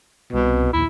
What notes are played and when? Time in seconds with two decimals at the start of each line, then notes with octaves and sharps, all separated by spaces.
0.33 C2 B2
0.73 A#1 D#2 E4